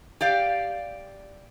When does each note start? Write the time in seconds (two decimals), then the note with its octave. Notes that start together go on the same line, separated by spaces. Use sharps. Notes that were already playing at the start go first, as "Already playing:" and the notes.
0.21 G4 D5 F5